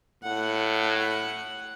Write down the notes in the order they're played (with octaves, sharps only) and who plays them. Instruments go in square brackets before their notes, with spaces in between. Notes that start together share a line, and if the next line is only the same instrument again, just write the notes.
[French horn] A2 [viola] F#5